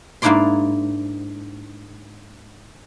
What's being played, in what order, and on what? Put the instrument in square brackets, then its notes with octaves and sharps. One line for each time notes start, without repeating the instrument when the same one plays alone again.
[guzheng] G#2 A#3 D4 E4 D5 C6